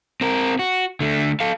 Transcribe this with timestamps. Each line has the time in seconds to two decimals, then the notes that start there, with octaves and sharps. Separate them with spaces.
0.21 C4 A#4
0.59 F#4
1.00 D3 A3
1.40 A4 F5